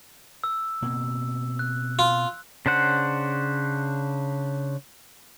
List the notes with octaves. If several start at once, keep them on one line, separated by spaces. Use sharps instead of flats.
E6
B2 A#3 C4
F#6
F4
C#3 D4 C5 F#5